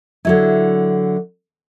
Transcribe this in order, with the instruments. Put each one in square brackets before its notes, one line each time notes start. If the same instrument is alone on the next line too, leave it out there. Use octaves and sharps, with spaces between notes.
[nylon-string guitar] D3 F#3 E4